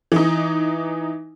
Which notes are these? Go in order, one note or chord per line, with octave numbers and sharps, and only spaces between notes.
E3 D#4